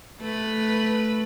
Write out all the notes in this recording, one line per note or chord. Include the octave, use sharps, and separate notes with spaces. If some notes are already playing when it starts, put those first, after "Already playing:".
A3 B4